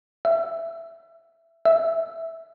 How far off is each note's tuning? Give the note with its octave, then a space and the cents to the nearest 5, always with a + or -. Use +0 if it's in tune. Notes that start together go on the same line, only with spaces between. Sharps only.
E5 +15
E5 -5